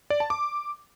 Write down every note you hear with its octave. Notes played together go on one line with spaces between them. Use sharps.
D5
A5
D6